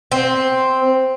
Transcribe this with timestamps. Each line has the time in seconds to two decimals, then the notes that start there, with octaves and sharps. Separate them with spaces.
0.12 C4